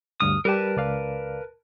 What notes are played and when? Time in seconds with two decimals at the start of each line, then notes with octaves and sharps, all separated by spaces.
0.20 D2 G2 D#6 F6
0.45 G3 G4 A#4 B4 A5
0.77 C#2 D5 F5